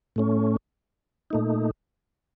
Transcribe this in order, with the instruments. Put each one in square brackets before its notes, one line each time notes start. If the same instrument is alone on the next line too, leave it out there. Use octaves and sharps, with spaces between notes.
[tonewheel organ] A2 A3 C#4
A#2 A3 D#4